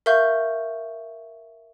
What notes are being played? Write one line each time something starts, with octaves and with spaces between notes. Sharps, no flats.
A#4 E5 F5 C#6 G6